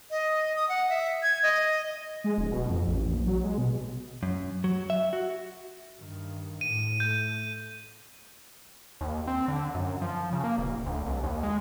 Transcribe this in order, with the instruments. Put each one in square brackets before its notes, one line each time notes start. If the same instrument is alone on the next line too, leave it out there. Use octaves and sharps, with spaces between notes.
[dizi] D#5
D#6
F#5
E5
G#6
D#5
[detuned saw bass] G#3
D1
B2
F2
A1
A#1
F#3
G#3
B2
[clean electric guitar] F#2
F#3
E5
F#4
[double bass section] G2 D#3
[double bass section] A2 [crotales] D#7
[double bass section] A3 [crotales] G6
[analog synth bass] D#2
C4
D3
F#2
F3
C#3
A#3
D#1
D2
C2
D#2
G#3